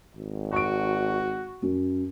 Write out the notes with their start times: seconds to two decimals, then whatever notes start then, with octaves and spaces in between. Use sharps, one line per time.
0.16 G#1
0.53 F#4 C#6 D7
1.62 F#2